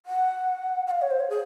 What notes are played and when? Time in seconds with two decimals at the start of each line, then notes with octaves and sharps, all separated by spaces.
0.06 F#5
0.87 F#5
0.91 F5
1.02 C#5
1.11 C5
1.20 C#5
1.30 G#4